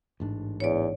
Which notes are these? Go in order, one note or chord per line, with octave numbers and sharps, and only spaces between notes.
A1 G#2 D4
E2 C#5 D5